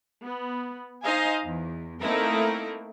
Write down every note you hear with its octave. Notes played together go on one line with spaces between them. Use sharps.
B3
D#4 C5 D#5 F5 G#5
E2
A3 A#3 C4 D#4 E4 A#4